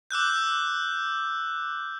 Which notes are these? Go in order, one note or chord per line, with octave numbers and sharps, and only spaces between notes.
D6 E6 F#6 G6